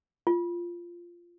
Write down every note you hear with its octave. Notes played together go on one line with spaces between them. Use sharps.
F4